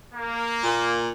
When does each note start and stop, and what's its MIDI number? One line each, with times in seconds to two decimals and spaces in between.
0.13 1.03 58
0.63 1.10 46